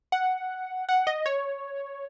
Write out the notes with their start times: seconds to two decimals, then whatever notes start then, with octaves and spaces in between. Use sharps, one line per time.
0.12 F#5
0.89 F#5
1.07 D#5
1.26 C#5